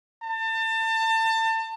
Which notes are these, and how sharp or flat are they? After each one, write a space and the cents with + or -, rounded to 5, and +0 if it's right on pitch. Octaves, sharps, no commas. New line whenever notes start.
A5 +30